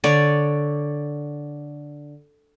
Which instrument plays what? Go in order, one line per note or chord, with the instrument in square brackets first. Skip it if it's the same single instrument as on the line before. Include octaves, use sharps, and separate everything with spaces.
[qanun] D3 C#5 D5